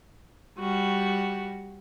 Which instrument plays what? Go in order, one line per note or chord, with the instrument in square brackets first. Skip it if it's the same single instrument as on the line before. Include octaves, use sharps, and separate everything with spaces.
[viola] G3 F#4